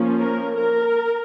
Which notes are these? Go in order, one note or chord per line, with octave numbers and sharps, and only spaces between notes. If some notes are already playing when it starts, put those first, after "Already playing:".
Already playing: F3 A#3 C#4
A#4
A#4